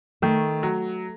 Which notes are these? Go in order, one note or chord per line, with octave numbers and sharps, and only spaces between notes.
D#3 A3
F#3